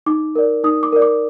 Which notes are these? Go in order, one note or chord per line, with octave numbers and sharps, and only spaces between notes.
D#4 D6
A#4 D5
D#4 D#6
D6
A#4 D5
D6